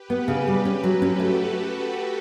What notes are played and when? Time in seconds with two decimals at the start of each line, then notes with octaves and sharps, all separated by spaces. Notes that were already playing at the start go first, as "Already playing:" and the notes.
Already playing: G4 B4
0.10 B3
0.28 C#3
0.47 G3
0.65 C#4
0.83 F#3
1.01 C#4 F#4 A4
1.19 A3